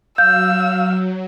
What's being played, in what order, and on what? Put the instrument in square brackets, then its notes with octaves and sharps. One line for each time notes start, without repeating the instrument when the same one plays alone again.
[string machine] F#3 [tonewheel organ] F5 [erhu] E6 [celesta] G6